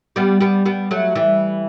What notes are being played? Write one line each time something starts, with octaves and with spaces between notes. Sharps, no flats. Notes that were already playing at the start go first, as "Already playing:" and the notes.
G3 B3
G3 B3
G3 B3
F#3 A3
E3 G3